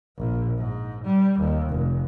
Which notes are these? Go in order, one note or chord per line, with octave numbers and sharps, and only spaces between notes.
A#1
G#2
G3
D#2
F1